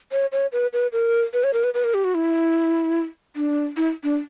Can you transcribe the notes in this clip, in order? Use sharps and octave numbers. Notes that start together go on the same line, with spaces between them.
C#5
C#5
B4
B4
A#4
B4
C#5
A#4
B4
B4
A#4
G4
F#4
E4
D4
E4
D4